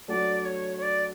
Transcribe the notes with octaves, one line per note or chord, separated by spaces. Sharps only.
F#3 A3 D4 F#4 D5
C#5
C#5
D5